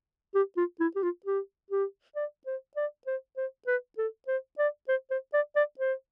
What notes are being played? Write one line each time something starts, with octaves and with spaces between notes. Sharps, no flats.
G4
F4
E4
G4
F4
G4
G4
D5
C5
D5
C5
C5
B4
A4
C5
D5
C5
C5
D5
D5
C5